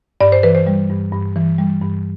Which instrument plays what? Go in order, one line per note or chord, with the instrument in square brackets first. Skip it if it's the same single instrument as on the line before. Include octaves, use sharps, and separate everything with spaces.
[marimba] G2 D5
C5
E3 B4
C5
G3
G2
G2
E3
G3
G2